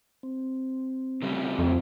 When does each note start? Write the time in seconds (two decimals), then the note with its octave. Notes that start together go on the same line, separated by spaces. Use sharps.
0.23 C4
1.22 C#3 G3 A3
1.59 F2